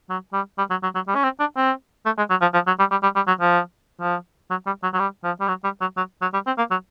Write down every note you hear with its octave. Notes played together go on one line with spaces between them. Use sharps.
F#3
G3
G3
F#3
F#3
F#3
G3
C#4
C4
D4
C4
A3
G#3
F#3
F3
F3
F#3
G3
G3
G3
G3
F#3
F3
F3
F#3
G3
F#3
F#3
G3
F3
G3
F#3
G3
F#3
F#3
F#3
G3
C4
A#3
F#3